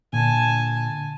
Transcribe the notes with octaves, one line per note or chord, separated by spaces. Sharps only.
A#2 D3 G#5 A5